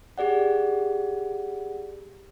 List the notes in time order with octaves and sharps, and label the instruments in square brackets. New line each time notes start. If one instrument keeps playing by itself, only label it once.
[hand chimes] G4 G#4 D5 F#5